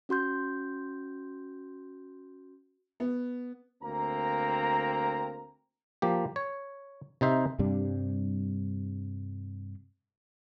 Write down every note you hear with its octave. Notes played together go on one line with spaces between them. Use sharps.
C#4 F#4 C6 G6
B3
D2 A#3 C4 A#5
F3 A#3 G4
C#5
C3 D#4 C5 E5
G2 C3 G3 D4